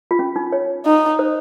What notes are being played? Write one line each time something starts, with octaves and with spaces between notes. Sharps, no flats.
F4
C#4
D#4
C#5
D#4
C5